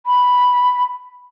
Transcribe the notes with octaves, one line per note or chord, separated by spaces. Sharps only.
B5